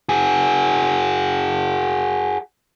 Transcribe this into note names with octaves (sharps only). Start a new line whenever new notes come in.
F#4 G#4